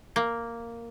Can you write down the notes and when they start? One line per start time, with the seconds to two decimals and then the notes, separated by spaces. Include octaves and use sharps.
0.16 A#3